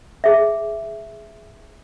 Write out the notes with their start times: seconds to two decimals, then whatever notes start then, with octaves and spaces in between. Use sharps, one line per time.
0.24 G#4 E5